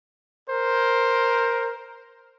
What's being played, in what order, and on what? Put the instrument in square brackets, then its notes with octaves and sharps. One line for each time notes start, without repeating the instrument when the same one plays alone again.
[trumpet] A#4 [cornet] C5